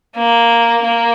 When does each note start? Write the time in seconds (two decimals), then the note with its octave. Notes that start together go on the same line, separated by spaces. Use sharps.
0.16 A#3
0.84 A#3